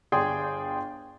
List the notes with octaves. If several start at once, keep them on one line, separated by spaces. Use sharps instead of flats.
G1 G#4 D5 G5 C6